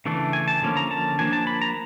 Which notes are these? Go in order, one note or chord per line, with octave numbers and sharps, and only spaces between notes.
C#3 E3 A3 D4
G#5
A5
D3 F3 A#3 C#4
A#5
A5
F3 A#3 D4 G#5
A5
B5
A#5